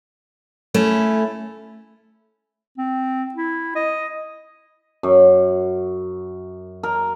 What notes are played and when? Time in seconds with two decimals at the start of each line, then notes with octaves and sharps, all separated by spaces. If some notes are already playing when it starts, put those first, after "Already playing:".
0.74 A3 C#4 E4
2.78 C4
3.34 E4
3.76 D#5
5.03 F#2
6.83 A#4